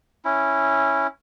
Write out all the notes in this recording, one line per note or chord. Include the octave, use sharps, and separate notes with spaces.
C#4 E4